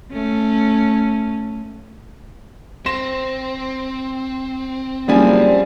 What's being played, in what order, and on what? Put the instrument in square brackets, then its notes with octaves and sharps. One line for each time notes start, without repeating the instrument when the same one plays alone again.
[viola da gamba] A3 C#4
[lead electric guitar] C4 [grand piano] C6 A#6 E7
[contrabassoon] F#1 [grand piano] F3 G3 G#5 [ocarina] D5